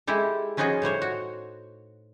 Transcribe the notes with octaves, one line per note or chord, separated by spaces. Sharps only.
G#3 E4 G4 A4
F3 C#4 D#4 F4 F#4 G#4
A2 G3 C5 C#5
F#4